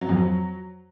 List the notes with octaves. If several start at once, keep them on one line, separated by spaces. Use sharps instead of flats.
F#3
F2
F#3